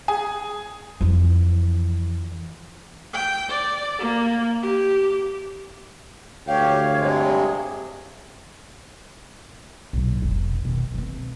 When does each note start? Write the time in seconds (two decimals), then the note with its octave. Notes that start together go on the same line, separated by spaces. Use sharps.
0.08 G#4
1.01 F2 E3
3.13 G5
3.50 D5
3.99 A#3
4.62 G4
6.47 D2 G4 C#5 F5
6.99 G2 C3 G#3
9.93 B1 A#2
10.22 F1
10.65 B2 D#3
10.94 E3 C4